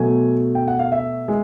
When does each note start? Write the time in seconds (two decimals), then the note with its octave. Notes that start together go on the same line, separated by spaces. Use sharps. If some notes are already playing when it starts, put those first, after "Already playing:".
Already playing: B2 F#3 A3 G#5
0.55 G5
0.68 F#5
0.79 F5
0.92 E5
1.28 G#3